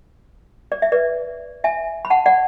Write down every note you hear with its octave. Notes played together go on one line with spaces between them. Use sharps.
D5
E5
B4 D5
E5 G#5
B5
F#5 A5
D5 F#5